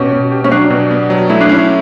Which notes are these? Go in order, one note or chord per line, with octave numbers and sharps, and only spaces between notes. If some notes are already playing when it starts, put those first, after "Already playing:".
Already playing: B2 C#4 G4
B2
G4
C#4
F#3 D4
B2
B3
F#3
A3 E4
D4
C#4 E4